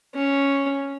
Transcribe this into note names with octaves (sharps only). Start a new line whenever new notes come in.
C#4